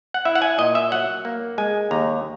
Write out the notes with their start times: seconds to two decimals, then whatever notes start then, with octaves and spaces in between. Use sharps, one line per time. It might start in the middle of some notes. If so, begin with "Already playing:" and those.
0.14 F#5
0.25 E4 E5
0.35 F#5
0.42 G#5
0.58 A#2 D#5
0.75 E5
0.92 F#3 F#5
1.25 A#3
1.58 G#3 G#5
1.91 D#2 A#5